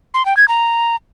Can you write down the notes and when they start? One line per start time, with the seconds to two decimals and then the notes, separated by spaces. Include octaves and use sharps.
0.14 C6
0.26 G5
0.37 G#6
0.48 A#5